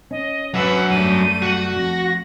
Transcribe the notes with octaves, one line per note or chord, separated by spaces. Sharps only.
C#4 D#5
F#3 B4 E5 F#5
F#2 G3 A3 D#7
F#4 F#5
F2 A#6